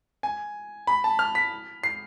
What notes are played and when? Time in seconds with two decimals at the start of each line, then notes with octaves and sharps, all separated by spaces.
0.23 G#5
0.87 B5
1.04 A5
1.19 F6
1.35 B6
1.84 C7